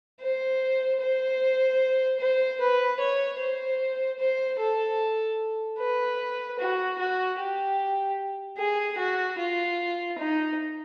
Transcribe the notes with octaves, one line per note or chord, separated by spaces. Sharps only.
C5
C5
C5
B4
C#5
C5
C5
A4
B4
F#4
F#4
G4
G#4
F#4
F4
D#4